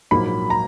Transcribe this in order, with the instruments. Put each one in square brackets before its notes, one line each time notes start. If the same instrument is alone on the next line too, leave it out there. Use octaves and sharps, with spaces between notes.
[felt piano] A#1 G#2 F#3 A#3 [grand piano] B5
[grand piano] A#5